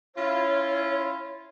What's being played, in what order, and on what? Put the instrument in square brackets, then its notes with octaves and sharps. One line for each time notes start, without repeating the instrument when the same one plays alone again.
[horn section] C#4 E4 F4 [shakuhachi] C#5